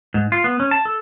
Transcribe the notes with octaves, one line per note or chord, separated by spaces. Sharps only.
G#2
F4
B3
C#4
A5
A4